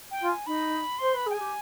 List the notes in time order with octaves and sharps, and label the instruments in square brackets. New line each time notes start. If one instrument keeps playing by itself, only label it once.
[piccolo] G5
[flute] F4
[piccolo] G#5
[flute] D#4 [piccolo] B5
[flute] C5 [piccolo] C6
[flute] B4 [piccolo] B5
[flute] G#4 [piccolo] G5
[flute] G4 [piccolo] G#5